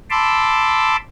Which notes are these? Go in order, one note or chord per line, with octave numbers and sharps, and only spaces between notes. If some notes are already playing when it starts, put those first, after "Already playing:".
A5 B5 C6 D6 E6